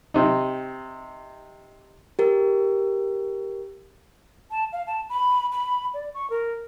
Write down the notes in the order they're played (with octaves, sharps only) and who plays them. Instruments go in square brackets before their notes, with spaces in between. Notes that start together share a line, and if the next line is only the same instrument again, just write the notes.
[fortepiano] C3 D#4
[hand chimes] G4 A#4
[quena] A5
F5
A5
B5
B5
D5
C#6
A#4